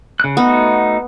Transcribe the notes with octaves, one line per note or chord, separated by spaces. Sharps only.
C#3 F#6
A3 B3 D#4 F#4